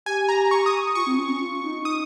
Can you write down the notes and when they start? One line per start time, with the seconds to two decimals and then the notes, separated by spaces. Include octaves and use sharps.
0.06 G4 G#5
0.29 A#5
0.51 C#6
0.66 D#6
0.95 F4 C#6
1.07 C4
1.18 C#4
1.30 C#4
1.41 F4
1.63 D#4
1.85 D#6